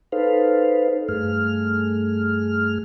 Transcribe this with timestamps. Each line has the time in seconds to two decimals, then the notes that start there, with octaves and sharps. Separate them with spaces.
0.12 D#4 A4 B4 C5 F5
1.09 G2 A3 G#4 F6